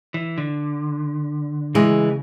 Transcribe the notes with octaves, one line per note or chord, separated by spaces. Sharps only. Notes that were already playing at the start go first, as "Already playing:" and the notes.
E3
D3
C#3 E3 G#3